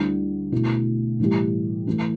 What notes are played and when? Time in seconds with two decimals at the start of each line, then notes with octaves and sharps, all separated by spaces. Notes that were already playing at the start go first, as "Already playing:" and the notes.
Already playing: D2 D3 G3 E4
0.52 B2 A3 E4
1.19 A2 E3 G3 E4 G4
1.87 E3 A3 E4